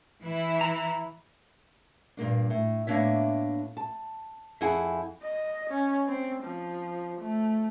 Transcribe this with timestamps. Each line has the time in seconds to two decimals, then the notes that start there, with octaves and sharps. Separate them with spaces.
0.23 E3 E4
0.61 A#5
2.17 G2 A#2 A#3 D4
2.50 A2
2.87 A2 A#3 B3 D4 C#5 E5
3.77 A5
4.61 F2 C4 E4 G#4 F#5 G#5
5.23 D#5
5.70 C#4
6.08 C4
6.44 F3
7.21 A3